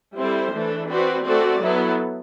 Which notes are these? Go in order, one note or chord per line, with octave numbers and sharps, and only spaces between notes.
G3 C4 E4 A4 C5
E3 A3 D4 A4
C4 F#4 B4 D5
A3 C4 F#4 A4 D5
F#3 B3 E4 A4